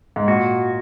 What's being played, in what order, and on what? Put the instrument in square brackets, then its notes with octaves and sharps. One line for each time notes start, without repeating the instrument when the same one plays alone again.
[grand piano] G#2
[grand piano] A#2 [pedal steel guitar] F#4